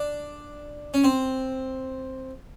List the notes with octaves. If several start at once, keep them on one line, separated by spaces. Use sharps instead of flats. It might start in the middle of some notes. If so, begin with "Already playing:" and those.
Already playing: D4
C#4
C4